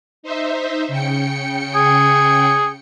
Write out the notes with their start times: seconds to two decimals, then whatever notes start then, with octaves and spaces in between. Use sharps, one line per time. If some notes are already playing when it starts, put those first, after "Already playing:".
0.23 D#4 C5 E5
0.88 C#3 G5 C#7
1.75 G#4